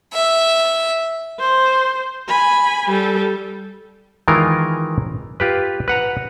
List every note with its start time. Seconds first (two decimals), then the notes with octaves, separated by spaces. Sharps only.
0.13 E5
1.39 C5
2.28 G#5 B5
2.89 G3 A4
4.28 D#3 E3 G#3 F4 A#4
5.40 F4 G4 B4
5.88 B4 F#5 A#5